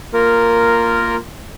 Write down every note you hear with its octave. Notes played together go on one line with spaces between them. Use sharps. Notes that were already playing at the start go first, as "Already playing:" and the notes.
A#3 F4 A#4